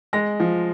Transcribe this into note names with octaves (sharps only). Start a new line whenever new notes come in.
G#3 A#6
F3